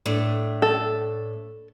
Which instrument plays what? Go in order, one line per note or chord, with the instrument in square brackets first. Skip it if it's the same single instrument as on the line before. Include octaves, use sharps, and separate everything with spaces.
[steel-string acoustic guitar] A2 A3 D4
[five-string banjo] A4